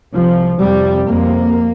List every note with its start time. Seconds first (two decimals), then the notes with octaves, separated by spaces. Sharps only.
0.12 C2 C3 F3
0.59 F2 C3 G3
1.08 F2 C3 A#3